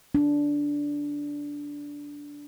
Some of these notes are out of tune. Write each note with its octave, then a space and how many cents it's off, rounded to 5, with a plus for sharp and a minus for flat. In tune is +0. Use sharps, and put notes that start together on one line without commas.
D4 -10